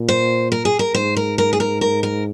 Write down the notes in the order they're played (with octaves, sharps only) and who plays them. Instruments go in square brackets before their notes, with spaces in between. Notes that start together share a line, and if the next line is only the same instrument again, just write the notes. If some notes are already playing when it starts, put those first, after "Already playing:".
Already playing: [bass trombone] A#2
[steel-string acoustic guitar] C5
A#4
G#4
A#4
[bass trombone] G#2 [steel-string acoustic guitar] C5
[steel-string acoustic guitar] A#4
A#4
G#4
A#4
A#4
A#4